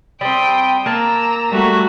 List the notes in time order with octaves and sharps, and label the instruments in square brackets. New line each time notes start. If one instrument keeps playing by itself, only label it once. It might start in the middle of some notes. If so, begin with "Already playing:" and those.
[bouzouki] G3 C4 [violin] G5 D#6
[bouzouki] A#3 A5 [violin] A#5 E6
[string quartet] G3 A3 F#4